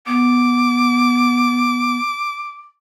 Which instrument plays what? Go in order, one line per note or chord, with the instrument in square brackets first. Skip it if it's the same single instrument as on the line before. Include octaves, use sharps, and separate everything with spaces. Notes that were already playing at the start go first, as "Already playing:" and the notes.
[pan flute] B3 [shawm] D6